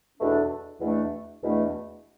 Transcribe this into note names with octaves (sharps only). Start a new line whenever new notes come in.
E2 B2 A3 D4
E2 B2 A3 D4
E2 B2 A3 D4